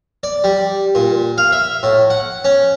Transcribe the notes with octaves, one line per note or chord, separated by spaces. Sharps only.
D5
G3
A#2
F5
E5
A2
F#5
C#4